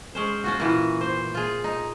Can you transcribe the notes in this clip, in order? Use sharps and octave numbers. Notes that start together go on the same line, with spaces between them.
G#3 C#4 C5
C#4 F4 F#4
A#2 E3 F#4
C5
F4 G#4
D#4